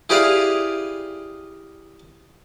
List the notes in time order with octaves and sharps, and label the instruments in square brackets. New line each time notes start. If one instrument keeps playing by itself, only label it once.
[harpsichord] E4 G4 G#4 B4 D5 F5